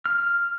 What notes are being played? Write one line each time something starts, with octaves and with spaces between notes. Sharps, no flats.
F6